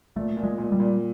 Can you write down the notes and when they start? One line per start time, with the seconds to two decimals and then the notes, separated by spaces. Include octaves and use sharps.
0.16 A#2 A3
0.37 A#2
0.43 G#3
0.58 A#2
0.72 G3
0.80 A#2